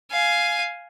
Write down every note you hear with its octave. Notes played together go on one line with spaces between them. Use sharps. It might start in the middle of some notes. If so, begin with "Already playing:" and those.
F5 G#5